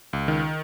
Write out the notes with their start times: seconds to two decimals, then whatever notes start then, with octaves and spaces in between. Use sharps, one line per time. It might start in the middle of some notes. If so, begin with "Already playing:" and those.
0.13 C#2
0.28 D#3